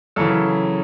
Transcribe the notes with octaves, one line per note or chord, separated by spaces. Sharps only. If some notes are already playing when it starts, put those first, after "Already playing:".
F#2 C#3 E3 A4